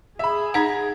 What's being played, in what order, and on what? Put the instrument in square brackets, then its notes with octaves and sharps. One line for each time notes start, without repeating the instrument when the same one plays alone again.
[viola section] G#4 [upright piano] E5 B5
[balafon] D#4 F#5 [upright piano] A#5 G#6